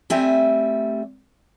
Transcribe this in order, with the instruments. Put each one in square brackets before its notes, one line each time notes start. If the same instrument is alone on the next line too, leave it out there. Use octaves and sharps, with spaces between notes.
[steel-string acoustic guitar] G3 A3 C4 E5 G#5